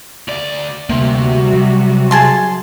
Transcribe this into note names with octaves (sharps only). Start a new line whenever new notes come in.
D2 D5
D2 C3 G3 A#3 F#4
F#3
G#4 A5 C6